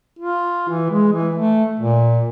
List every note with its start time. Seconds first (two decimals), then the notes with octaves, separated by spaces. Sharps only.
0.19 F4
0.69 E3
0.91 G#3
1.12 E3
1.35 A3
1.80 A#2